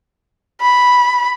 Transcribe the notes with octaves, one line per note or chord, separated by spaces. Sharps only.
B5